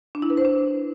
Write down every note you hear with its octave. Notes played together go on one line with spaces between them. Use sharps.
D4
E4
B4
C5
D4